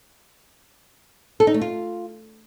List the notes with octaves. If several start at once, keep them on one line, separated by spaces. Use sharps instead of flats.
A4
D#4
A3
F4